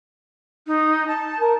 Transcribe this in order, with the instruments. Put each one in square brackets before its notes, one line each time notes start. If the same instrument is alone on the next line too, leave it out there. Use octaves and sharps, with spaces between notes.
[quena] D#4
A5
[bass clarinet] A#4